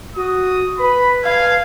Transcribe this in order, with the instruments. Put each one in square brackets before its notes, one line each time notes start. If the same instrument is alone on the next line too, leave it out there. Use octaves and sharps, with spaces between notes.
[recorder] F#4 [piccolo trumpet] D#6
[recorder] B4 [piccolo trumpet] B5
[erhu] F5 [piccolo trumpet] G#6